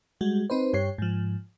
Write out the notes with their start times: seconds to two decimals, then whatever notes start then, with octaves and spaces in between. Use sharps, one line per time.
0.21 G3 G#3 F#4
0.50 C4 D#4 B4 C5
0.73 G2 G4 C#5 C7
0.98 G#2 F3